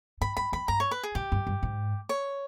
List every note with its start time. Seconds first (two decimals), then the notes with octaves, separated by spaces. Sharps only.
0.21 G#2 B5
0.37 G2 B5
0.52 E2 B5
0.68 G2 A#5
0.80 C#5
0.91 B4
1.03 G#4
1.15 G#2 G4
1.32 G2
1.47 G2
1.63 G#2
2.09 C#5